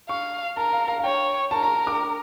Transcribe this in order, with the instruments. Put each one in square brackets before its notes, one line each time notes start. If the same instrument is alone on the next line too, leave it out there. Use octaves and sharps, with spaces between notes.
[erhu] F5 [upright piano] C#6
[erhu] A#4 [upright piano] A5
[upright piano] F5
F5
F5
[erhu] C#5 [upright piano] G5
[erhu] A#4 [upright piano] A5
[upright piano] A#5
D6